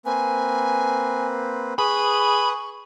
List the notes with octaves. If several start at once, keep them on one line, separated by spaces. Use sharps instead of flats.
A#3 C4 B4 G#5
G#4 B4 B5 C#6 D#6